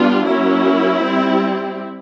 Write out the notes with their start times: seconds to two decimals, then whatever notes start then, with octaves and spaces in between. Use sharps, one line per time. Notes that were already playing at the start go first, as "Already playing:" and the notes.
Already playing: G3 B3 D4 F4
0.27 F#3 A#3 C#4 E4
1.02 G3 C4